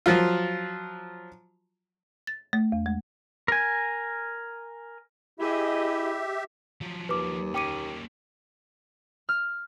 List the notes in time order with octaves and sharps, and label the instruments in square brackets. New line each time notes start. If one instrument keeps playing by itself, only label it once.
[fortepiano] F3 F#3 F4
[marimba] A6
A3
E2
G#3
[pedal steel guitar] A#4 G#5
[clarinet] E4 [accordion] G4 E5 [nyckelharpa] G#4 D#5
[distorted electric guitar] F3 F#3
[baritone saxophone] D#2 [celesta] B4 D6
[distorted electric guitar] A#3 C#4 [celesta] G5 D6 D#7
[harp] F6